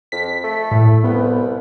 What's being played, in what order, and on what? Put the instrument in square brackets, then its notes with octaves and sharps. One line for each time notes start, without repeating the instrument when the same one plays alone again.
[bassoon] F2 [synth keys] B6
[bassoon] A3
[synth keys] A2
[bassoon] C2 [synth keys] B3